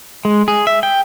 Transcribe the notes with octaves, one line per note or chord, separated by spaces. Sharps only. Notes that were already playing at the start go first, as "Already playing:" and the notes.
G#3
G#4
E5
G5